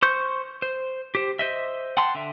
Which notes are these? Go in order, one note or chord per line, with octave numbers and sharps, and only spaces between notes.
C5 C#6 G6
C5
G4 C5
C5 D#5 E5
F#5 G5 A5 C6
D3 E5